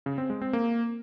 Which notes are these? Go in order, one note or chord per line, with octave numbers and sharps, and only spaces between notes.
C#3
C4
G#3
C4
A#3